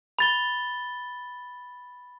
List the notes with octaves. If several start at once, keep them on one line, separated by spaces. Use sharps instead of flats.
B5 A6 G7